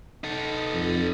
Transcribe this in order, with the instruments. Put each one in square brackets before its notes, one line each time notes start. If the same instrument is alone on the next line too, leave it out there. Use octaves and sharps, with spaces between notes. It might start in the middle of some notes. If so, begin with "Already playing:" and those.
[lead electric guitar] D#4 A4
[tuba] F2